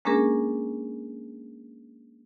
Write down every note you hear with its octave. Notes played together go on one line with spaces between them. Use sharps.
G#3 A#3 C#4 D4 G#4 A#4